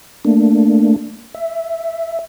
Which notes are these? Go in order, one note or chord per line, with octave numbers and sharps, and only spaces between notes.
A3 A#3 D4
E5